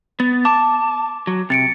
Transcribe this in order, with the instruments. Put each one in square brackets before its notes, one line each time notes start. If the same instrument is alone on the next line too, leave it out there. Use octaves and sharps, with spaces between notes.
[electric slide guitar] B3 [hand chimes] A6
[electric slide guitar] A5 [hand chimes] D6
[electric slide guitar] F#3
[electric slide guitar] C3 [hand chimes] A6 C#7 D7